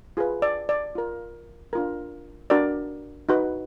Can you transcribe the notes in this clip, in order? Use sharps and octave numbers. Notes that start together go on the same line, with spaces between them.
F4 G#4 B4
D5
D5
F4 A#4
D4 F4 A#4
D4 F#4 A#4 D5
D#4 F#4 B4